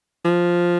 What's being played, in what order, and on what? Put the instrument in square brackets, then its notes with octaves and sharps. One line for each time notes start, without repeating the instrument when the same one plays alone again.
[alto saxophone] F3